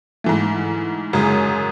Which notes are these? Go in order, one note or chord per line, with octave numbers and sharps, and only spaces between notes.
G#2 E3 A3
F#2 C#3 G#3